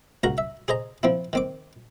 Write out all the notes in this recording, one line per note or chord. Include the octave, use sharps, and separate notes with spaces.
C#2 F#4 A#4 A#5
E5
G#4 C5 D#5 A#5
F3 C4 E4
D#3 C4 D6